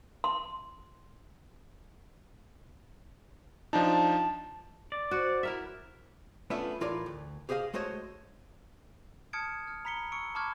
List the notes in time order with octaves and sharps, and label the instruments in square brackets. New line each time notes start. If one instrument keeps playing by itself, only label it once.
[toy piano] C6
[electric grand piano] F3 D4 D#4 [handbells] A5
[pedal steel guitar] D5
[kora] F#4 [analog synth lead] C5
[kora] E4 A#4 E5
[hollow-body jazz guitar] A3 B3 C#4 D4 F4 E5
A2 E3 F4 A#4 C#5 D5
D2
G4 G#4 C5 D#5 F5
G#3 A3 F#4 C5 C#5 D#5
[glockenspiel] A5 D#6 F6 G#6 C#7 D7
F6
A#5 B5 B6 C#7 G7
C#6 E6 C#7 D7
A5 B5 C#6 D6 F6 G#6